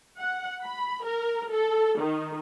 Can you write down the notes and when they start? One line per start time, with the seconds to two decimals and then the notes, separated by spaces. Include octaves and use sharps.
0.19 F#5
0.61 B5
1.03 A#4
1.51 A4
1.99 D#3